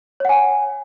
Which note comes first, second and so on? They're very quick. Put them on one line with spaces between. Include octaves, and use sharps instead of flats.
C#5 F#5 G#5